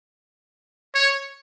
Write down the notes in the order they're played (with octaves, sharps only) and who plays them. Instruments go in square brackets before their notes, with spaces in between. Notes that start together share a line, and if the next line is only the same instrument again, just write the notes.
[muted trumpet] C#5